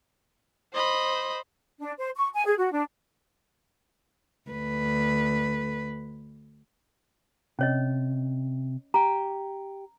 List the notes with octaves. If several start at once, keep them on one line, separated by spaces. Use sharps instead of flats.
C5 D#5 B5
D4
C5
C#6
G#5
G#4
F#4
D4
D2 B4
C3 C#4 C#5 D#5
G4 G5 A#5